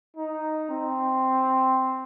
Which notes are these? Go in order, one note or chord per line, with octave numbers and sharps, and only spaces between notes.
D#4
C4